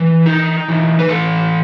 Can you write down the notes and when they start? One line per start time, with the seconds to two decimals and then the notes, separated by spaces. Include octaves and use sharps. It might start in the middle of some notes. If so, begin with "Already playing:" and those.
Already playing: E3
0.26 D#4
0.68 E3
0.99 B4
1.09 E3 A4